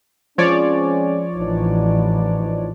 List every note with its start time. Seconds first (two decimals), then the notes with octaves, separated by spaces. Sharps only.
0.38 F3 G#3 C4 C#4 C#5 D5
1.36 A1 E3 D4 D#4